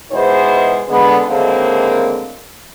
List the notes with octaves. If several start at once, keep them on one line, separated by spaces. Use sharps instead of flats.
G#2 B2 E3 G#3 C5
D3 G#3 B3
D#2 A2 D3 G#3 A#3 C4